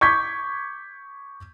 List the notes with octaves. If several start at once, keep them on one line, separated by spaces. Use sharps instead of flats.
C#6 D6 G6 G#6 B6